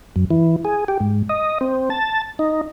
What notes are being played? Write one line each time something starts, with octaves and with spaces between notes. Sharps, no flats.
F#2
E3
G#4
G4
G#2
D#5
C4
A5
D#4